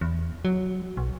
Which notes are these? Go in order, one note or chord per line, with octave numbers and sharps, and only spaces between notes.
E2
F#3
B1